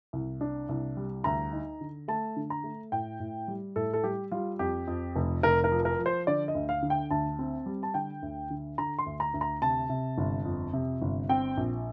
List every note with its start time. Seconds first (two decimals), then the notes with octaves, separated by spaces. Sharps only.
0.13 C2
0.41 D4
0.69 C2
0.97 G3
1.24 D2 A#5
1.53 D#4
1.81 D3
2.08 A3 A5
2.36 D3
2.50 A#5
2.64 A3
2.92 A2 G5
3.20 A2
3.48 G3
3.76 A2 A4
3.94 A4
4.04 G3 G4
4.31 G3 F4
4.59 F2 G4
4.87 F2
5.15 F1
5.43 F1 A#4
5.64 A#4
5.71 F3
5.85 A#4
5.99 F3
6.06 C5
6.27 D3 D5
6.48 D#5
6.55 D2
6.69 F5
6.82 D3
6.90 G5
7.11 D2 A5
7.39 C4
7.66 G3
7.83 A5
7.94 D3 G5
8.22 D2
8.50 D3
8.78 D3 A#5
8.99 C6
9.06 D2
9.20 A#5
9.34 D2
9.41 A#5
9.62 C3 A5
9.90 C3
10.17 G1
10.45 F2
10.74 C3
11.01 G1
11.29 C4 G5
11.57 A#1